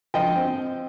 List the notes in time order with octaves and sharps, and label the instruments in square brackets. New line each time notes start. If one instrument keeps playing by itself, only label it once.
[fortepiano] F3 D#5 G5
C4